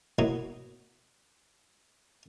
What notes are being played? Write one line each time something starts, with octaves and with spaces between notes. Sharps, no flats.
F#3 A#3 B3 D#4 E4 F#4